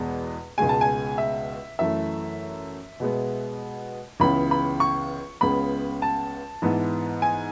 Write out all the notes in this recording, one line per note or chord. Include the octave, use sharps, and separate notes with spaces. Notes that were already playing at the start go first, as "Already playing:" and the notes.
Already playing: E2 B2 G#3 B3
C#2 B2 G#3 G#5
A5
G#5
E5
F#2 E3 A3 E5
B2 G#3 B3
C#2 C#3 E3 B3 B5
B5
C#6
C#2 C#3 G#3 B3 B5
A5
G#2 E3 B3
G#5